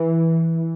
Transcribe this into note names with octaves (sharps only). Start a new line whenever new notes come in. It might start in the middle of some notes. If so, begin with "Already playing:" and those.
Already playing: E3